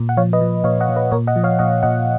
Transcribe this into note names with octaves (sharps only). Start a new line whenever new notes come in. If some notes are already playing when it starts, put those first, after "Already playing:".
Already playing: A#2
F#5
F3 C#5 F5
B4 D#5
F3
A#2 C#5 F5
D#5 F#5
A#2
B4 D#5
A#2 A#4 C#5
D#5 F#5
F3
C#5 F5
A#2 D#5 F#5
A#2 D#5 F#5